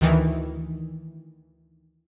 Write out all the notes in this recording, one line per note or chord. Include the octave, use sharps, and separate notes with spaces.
D2 D#3 E3